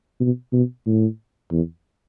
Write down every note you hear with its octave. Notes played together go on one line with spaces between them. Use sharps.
B2
B2
A2
E2